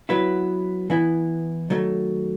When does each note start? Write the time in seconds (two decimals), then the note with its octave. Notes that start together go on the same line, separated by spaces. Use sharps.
0.09 F#3 B3 E4 B4
0.90 E3 B3 E4
1.70 D#3 F#3 A3